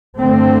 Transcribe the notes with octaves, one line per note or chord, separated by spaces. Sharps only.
G2 D3 A3 C4